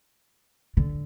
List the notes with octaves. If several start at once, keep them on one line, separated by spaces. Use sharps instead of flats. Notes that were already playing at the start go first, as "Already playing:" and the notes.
D3